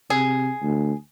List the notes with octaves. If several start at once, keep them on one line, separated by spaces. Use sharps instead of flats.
C3 G#4
D2